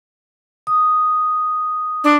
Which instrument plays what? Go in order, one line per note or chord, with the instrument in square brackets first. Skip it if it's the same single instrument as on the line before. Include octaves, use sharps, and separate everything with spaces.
[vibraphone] D#6
[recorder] D4